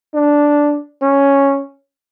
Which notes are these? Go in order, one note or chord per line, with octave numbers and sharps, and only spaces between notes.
D4
C#4